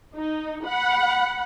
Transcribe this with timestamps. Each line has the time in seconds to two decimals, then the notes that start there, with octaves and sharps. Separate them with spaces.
0.15 D#4
0.67 F#5 B5